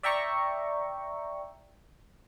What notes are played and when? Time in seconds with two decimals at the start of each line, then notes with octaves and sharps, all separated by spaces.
0.03 D5 E5 G5 A#5 C#6